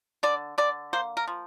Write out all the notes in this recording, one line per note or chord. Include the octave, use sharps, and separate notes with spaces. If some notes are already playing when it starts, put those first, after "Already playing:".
D3 D5
D3 D5
A#3 C5
A#4
F3